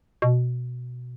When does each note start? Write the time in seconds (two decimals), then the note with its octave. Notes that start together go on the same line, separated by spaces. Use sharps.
0.22 B2